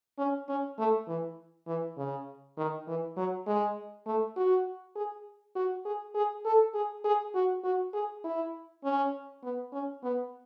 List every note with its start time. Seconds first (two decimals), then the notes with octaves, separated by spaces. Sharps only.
0.19 C#4
0.49 C#4
0.79 A3
1.08 E3
1.67 E3
1.98 C#3
2.58 D#3
2.88 E3
3.17 F#3
3.47 G#3
4.07 A3
4.37 F#4
4.96 G#4
5.56 F#4
5.85 G#4
6.15 G#4
6.45 A4
6.74 G#4
7.05 G#4
7.35 F#4
7.64 F#4
7.94 G#4
8.24 E4
8.84 C#4
9.43 B3
9.73 C#4
10.03 B3